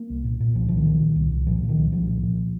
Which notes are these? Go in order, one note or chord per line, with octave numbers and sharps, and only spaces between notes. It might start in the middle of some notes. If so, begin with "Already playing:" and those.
Already playing: A#3
C2
A#2
A#2
C2 F3
C2 F3
D#3
A#2
A#2
C2
C2
A#2 F3
A#2
D#3
C2
C2 F3
A#2
A#2